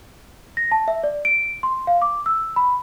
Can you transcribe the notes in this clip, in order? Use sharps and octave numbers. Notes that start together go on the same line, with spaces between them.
A#6
A5
E5
D5
D7
C6
F5
D6
E6
B5